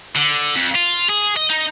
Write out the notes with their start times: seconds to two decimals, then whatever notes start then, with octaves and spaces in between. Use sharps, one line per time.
0.16 D3
0.56 F2
0.75 F4
1.09 G#4
1.36 D#5
1.50 D#4